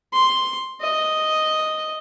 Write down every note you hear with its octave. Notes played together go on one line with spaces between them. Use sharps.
C6
D#5